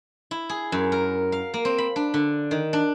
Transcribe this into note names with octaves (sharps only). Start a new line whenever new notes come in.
E4
G#4
F#2
A#4
F5
A#3
C4
B5
D4
D3
D#3
D4